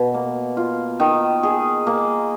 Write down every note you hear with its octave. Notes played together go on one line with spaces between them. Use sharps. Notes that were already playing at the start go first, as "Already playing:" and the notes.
Already playing: B2
A#3
F4
D#3
G#4
A#3